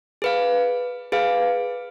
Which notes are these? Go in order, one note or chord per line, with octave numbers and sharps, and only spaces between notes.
G#4 B4 F5
G#4 B4 F5